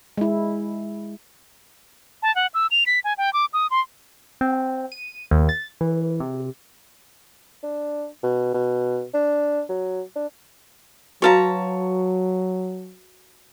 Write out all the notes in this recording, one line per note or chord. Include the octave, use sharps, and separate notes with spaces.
G#3 E4
A5
F#5
E6
F7
B6
G#5
G5
D6
D#6
C6
C4
D#7
D#2
A6
E3
C3
D4
B2
B2
D4
F#3
D4
F#3 F#4 B4 C#5 F5 A5 A#5